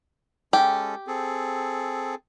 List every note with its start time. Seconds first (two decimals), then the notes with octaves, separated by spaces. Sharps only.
0.53 G#3 C#4 G4 A4
1.07 C4 G#4 A4